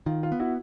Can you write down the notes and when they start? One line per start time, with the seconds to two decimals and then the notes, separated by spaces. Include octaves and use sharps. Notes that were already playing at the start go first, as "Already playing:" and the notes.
0.06 D#3 F4
0.23 F4
0.32 B3
0.40 E4 F#4